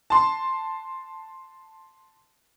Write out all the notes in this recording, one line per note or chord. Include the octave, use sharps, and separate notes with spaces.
A5 C6